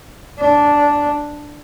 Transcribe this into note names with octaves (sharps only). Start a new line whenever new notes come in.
D4